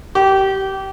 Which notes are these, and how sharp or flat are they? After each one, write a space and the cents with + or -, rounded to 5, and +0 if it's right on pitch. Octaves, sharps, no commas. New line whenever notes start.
G4 -20